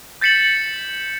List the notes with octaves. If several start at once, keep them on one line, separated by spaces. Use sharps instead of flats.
G6 A6 B6 C#7 E7 F#7